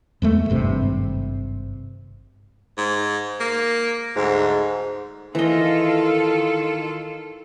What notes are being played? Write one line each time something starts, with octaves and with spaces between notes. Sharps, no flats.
E2 G#3 A3
G#1 G2 C3
G#2
A#3
D2 G#2
D#3 E3 F4 A4 D#5